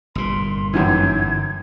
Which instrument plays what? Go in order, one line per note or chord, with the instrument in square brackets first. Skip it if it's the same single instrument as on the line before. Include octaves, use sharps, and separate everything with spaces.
[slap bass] G1 A#2 [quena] C6
[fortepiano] F#2 D#3 E3 [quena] G#6